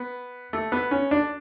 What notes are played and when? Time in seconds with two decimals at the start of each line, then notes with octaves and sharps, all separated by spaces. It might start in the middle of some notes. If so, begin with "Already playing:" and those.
Already playing: B3
0.53 A3
0.72 B3
0.91 C#4
1.11 D4